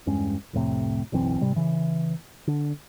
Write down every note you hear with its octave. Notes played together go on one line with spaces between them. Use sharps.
E2 G2 G#3 C#4
C2 F2 A2 C3
F#1 B1 E3 C4
G#2 C3 G3
C#3 E3
D3 D4